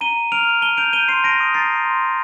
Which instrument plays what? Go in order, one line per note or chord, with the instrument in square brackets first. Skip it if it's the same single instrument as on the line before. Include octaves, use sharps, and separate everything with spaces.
[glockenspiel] A#5 D#7 G7
A#5
F6 D7 F7
F6
A5 D#7 G7
G6 D7 F7
G6 D#7 G7
C6 C7 D#7
A5 A#6 D7
D#6
A#5 A6 C7
A#5
C6
D#6